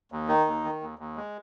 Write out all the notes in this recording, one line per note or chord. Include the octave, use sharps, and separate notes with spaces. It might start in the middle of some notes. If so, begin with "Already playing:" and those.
D#2
D#3 D#4
D#2
D#3
D#2
D#2
G#3